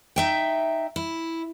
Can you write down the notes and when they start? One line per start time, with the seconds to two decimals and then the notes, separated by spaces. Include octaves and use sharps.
0.16 D#4 E5 G5
0.96 E4